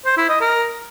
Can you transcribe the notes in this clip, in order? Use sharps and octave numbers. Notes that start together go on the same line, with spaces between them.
C5
E4
D#5
A#4